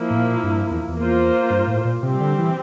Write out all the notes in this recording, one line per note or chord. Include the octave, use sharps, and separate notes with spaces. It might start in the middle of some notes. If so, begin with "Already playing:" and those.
Already playing: F3 A#3 E4
A2
A#2
G2
E2
E2
A#3 F4 C5
G2
A2
A#2
C3 G3 C4 G4
D3
E3